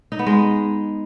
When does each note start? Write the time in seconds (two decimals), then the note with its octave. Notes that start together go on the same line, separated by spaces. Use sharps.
0.12 D#4
0.19 B3
0.26 G#3